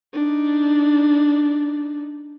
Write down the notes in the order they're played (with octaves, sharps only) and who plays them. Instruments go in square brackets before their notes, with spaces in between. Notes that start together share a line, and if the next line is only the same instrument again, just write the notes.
[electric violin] D4 D#4